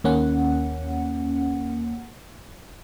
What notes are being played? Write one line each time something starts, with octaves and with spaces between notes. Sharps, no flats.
D#2 A#3 C#4 F#5